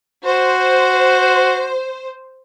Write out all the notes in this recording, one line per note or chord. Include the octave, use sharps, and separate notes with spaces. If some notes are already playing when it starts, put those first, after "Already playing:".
F#4 C5